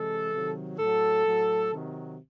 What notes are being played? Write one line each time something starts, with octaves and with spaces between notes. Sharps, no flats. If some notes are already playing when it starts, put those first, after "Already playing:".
Already playing: C3 E3 G#3 A4
C3 D#3 F#3
A2 F#3 A4
A2 F#3
C3 D#3 F#3